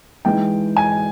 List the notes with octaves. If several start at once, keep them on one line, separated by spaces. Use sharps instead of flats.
E3 G#3 D#4 G5
G#5